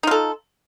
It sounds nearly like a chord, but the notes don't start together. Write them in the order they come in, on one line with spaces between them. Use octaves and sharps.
D#4 F4 A4